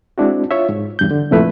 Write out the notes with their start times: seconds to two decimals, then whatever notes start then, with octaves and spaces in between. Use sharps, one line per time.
0.18 G#3 C4 D4 E4 F#4
0.51 F4 C#5 E5
0.69 G#2
0.99 E2 G2 G6
1.11 D3
1.31 C2 F2 A#2 A3 E4 B4